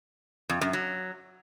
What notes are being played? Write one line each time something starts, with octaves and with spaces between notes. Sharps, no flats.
F2
F#2
F#3